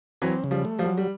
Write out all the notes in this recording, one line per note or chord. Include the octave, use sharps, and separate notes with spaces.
E3 F#3 C4
C#3
F3 G3
A3
F3 G3
F#3
G3